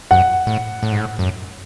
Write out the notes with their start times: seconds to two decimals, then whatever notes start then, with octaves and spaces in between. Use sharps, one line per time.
0.11 F#2 F#5
0.47 A2
0.83 A2
0.92 G#2
1.00 A2
1.19 F#2